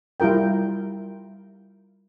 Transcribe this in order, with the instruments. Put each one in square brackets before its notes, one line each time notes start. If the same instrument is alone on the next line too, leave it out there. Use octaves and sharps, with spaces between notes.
[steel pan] G3 E4 F4 A#4 G5